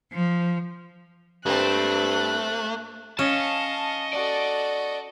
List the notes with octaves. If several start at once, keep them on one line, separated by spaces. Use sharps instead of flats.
F3
G2 A3 A#3 C4 F#6
C#4 D#5 F5 A5 C#6
F#4 A4 D5